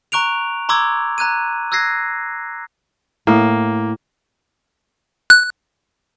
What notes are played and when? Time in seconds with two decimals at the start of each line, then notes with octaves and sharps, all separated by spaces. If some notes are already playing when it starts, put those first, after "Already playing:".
0.12 A#5 C#6 F#6 D7 F7
0.69 A#5 C6 D6 E6 G#6
1.18 A#5 F#6 G#6 D#7
1.72 E6 F#6 G#6 A#6 C7
3.27 A2 A#3
5.30 F#6